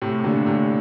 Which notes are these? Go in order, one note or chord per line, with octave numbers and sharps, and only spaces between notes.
A2 C3
C3
A#2 D3
A2 C3